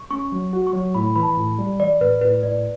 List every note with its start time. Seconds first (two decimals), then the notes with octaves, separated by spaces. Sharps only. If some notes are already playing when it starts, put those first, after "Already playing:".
Already playing: C#6
0.11 C#4 C#6
0.32 F#3
0.53 F#4
0.67 C#6
0.73 F#3
0.95 A2 B5
1.16 E3 B5
1.23 A5
1.37 A2
1.58 G3
1.80 E3 D5
2.00 A2 B4
2.21 A2 B4
2.43 A2 D5